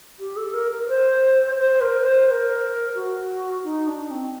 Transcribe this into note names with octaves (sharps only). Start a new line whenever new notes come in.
G4
A4
A#4
A#4
C5
C5
A#4
C5
C5
A#4
F#4
D#4
D4
C4